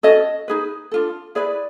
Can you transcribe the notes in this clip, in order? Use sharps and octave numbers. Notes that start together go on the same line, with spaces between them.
C#4 F#4 A4 D#5
D#4 G#4 B4
D4 F4 A4
E4 G#4 B4 D5